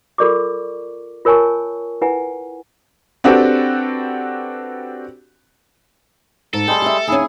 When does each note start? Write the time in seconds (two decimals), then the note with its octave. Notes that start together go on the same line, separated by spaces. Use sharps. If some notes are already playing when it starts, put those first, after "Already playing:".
0.18 F4 A4 A#4 D5 C#6 D6
1.25 F4 A#4 C#5 G#5 A5 C#6
2.02 E4 B4 F#5 G#5
3.24 C4 D4 F#4 G4 A4 B4
6.53 G#2 A4
6.68 G3 G#3 G#4 G5 A5
6.82 G4 E5
7.08 D#2 C#4 E4 G#4